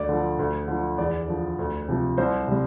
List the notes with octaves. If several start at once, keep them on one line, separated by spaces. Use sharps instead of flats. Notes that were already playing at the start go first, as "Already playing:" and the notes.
Already playing: D2 D5
D3 F3
D2
D3 F3
E2 D5
D3 F3
D2
C3 F3
C2 C5
C3 G3